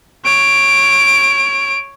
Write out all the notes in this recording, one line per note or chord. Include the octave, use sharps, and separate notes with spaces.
C#5 D7